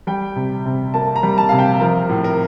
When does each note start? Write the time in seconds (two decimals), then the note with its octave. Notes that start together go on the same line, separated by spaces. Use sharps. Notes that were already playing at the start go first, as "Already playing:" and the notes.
0.07 G3 G5
0.36 C3
0.66 C3
0.94 A#3 A5
1.16 A#5
1.23 G3
1.38 A5
1.49 C3 F5
1.59 G5
1.80 F3 A#4
2.09 A2
2.24 A#4